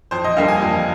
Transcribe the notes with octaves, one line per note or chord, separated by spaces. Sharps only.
F2 C5
D#5
D3 G3 A#3 F5
G#5
F2